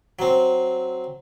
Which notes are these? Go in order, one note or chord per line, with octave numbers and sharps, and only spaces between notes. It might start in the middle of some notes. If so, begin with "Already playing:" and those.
F#3 C4